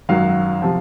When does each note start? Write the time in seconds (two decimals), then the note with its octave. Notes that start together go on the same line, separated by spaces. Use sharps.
0.09 G#1 F#2 D#3 F#3 F5
0.62 C3 F3